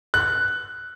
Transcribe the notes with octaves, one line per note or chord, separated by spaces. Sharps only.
F#6